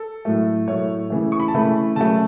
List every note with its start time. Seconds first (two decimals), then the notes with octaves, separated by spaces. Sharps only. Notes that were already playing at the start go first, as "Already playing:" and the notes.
Already playing: A4
0.25 A2 F#3 A3
0.68 A2 F#3 A3 C#5
1.10 C#3 E3 A3
1.32 C#6
1.40 B5
1.48 A5
1.54 C#3 E3 A3 B5
1.96 C#3 F#3 A3 A5